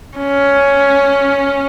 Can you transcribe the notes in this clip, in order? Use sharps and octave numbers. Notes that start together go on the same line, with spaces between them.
C#4